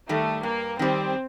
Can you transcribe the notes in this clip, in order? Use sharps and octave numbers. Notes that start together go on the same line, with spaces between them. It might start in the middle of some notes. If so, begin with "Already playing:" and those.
D#3 G3 A3
G2 A#3
D#3 G3 C4